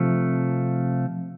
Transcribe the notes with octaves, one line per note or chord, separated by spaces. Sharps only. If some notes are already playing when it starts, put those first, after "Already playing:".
Already playing: C3 F3 A3